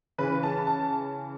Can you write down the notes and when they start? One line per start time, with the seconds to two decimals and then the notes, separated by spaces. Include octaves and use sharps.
0.18 C#3 E3 B4
0.43 A5
0.67 A5